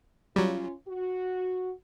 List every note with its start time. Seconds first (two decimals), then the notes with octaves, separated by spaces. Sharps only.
0.36 F#3 G3 C#4 F4
0.88 F#4